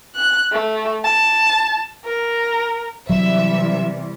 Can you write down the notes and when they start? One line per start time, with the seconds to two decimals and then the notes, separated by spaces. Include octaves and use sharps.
0.15 F#6
0.52 A3
1.04 A5
2.05 A#4
3.10 C3 E3 F#3 G3 E5